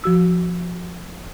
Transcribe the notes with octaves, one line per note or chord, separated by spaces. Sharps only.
F3 F#4 E6